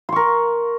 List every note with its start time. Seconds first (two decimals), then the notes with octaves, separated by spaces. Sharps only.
0.09 C6
0.12 C#6
0.16 A#4